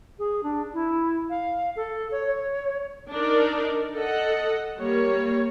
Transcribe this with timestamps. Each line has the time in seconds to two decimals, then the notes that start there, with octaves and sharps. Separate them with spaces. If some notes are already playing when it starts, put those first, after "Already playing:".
0.19 G#4
0.43 D4
0.73 E4
1.29 F5
1.76 A4
2.11 C#5
2.26 C#5
3.12 D4 D#4 A#4 D5
3.94 A4 D#5 F#5
4.76 G3 A#3 C#5